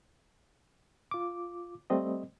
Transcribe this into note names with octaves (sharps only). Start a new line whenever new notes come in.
F4 D6
G3 A3 C4 D#5